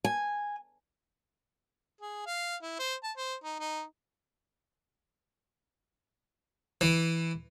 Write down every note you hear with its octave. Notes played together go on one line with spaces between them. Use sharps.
G#5
G#4
F5
E4
C5
A5
C5
D#4
D#4
E3